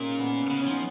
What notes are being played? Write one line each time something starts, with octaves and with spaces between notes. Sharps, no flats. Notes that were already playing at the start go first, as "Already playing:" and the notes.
Already playing: A#2 A#3 C#4 D#4 G#4 A#4
B3
C#3 B3
C#4
F3 D#4